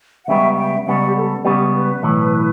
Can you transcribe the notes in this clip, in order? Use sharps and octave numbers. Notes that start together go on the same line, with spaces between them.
F#5
C#2 C#3 G3 B3 E5 G5
E5 G5
C#2 C#3 G3 B3 D5 F#5
G4
A4
C#2 C#3 G3 B3 G4
B4
B1 A2 E3